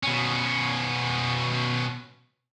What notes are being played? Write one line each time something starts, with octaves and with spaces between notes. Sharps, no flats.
B2 C#4